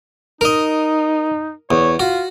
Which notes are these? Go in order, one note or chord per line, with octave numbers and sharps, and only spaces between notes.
D#4 A#4 D#5
E2 C#5
F4 F#4